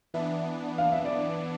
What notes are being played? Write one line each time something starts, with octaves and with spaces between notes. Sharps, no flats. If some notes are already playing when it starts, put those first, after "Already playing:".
E3 B3 D4 E5
F5
E5
D5